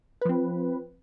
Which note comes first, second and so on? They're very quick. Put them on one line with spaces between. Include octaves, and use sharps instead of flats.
B4 F3 C4